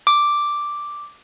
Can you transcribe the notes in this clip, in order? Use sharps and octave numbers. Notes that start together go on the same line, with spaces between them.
D6